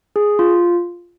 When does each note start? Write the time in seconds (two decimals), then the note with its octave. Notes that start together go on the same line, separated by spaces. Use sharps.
0.16 G#4
0.39 F4